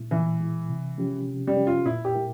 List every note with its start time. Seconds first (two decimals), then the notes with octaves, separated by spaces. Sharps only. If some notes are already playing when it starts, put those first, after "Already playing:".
Already playing: A#2 G#3 E4
0.11 A#2 E3
0.40 G#3 E4
0.69 C3
0.98 F3 G#3 C#4 G4
1.27 C3
1.47 G3
1.57 F3 G#3 C#4 G4
1.67 F4
1.85 A#2 E4
2.05 G4
2.15 G#3 E4 A#4